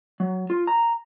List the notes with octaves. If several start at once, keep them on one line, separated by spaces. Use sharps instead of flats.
F#3
F4
A#5